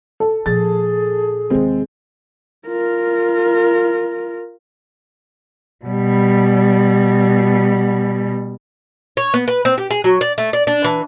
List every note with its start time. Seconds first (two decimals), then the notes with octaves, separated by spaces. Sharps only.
0.20 A4
0.46 A#2 F3 G#4 A6
1.50 D#2 C3 G#3 C4
2.67 F4 A#4
5.85 B2 G3
9.17 C#5
9.34 B3
9.48 B4
9.65 C4
9.78 G4
9.90 G#4
10.04 F#3
10.21 D5
10.38 A3
10.53 D5
10.67 D4
10.84 E3